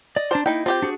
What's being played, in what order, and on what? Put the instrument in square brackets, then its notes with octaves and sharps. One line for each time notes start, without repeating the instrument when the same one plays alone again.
[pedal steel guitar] D5 [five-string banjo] D#5
[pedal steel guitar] D4 A5 C6 [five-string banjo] A#4 C5 D5
[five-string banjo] A#3 D#4 G5 [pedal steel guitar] E4
[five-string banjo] C4 G4 G5 [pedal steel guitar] F4
[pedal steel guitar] D4 F#4 G#4